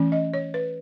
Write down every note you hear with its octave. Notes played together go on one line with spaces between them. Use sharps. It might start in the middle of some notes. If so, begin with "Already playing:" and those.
Already playing: E3 A3 C#4
D#5
C#5
B4